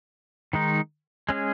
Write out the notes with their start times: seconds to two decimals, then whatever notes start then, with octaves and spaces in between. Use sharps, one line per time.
0.53 D#3 G#3 D#4
1.29 G#3 C#4 G#4